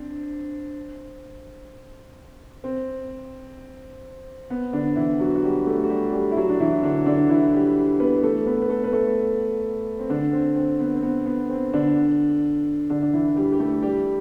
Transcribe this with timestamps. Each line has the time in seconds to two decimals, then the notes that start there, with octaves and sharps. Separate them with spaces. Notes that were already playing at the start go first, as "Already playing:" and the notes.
Already playing: C4 D4
2.64 C4
4.50 B3
4.73 D3 D4
4.96 E3 E4
5.19 F#3 F#4
5.36 F#4
5.43 G3 G4
5.67 A3 A4
5.84 F#4
5.90 G3 G4
6.13 G3 G4
6.32 E4
6.37 F#3 F#4
6.50 D4
6.60 E3 E4
6.83 D3 D4
7.06 D3 D4
7.29 E3 E4
7.53 G3 G4
8.00 B3 B4
8.23 A3 A4
8.46 B3 B4
8.62 B4
8.69 A3 A4
8.84 B4
8.93 A3 A4
9.99 C4
10.10 D3 D4
10.33 C4
10.56 C4
10.80 B3
10.95 C4
11.03 B3
11.26 B3
11.50 C4
11.73 D3 D4
12.90 D3 D4
13.02 D4
13.13 E3 E4
13.36 G3 G4
13.52 G4
13.60 A3 A4
13.83 G3 G4